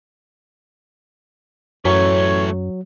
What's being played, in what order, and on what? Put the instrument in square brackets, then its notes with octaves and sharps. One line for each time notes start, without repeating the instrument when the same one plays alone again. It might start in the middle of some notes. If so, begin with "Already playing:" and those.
[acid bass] F#2 [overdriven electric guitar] E3 A3 [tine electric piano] F#3 [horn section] C#5